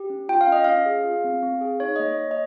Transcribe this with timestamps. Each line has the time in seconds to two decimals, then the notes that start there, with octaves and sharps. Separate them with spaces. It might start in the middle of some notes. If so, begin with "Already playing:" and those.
Already playing: G4
0.10 C#4
0.29 F4 G5
0.41 F5
0.47 C#4
0.52 D#5
0.64 C#4 F5
0.86 G#4
1.04 F4
1.24 C4
1.43 C4
1.61 G#4
1.80 D#4 C#5
1.96 A#3 D#5
2.06 C#5
2.19 A#3
2.31 D#5